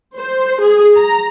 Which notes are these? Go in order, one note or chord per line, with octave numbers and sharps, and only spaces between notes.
C5
G#4
A#5